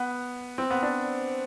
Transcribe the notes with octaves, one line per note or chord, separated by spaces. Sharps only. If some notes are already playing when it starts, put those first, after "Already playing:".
Already playing: B3
C4
B3
D4